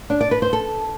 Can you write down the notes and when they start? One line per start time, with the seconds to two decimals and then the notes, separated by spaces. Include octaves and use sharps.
0.10 D4
0.21 D5
0.31 B4
0.42 C5
0.53 A4